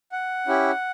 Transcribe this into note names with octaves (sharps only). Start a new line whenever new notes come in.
F#5
C#4 E4 G4